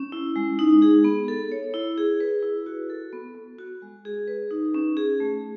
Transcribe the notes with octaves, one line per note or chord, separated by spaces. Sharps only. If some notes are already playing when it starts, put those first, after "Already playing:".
Already playing: C#4
E4
G#3
D#4
G#4
B3
A4
C#5
E4
G#4
B4
E4
F#4
A4
B3
B3
F#4
G#3
G#4
B4
D#4
C#4
G#4
A3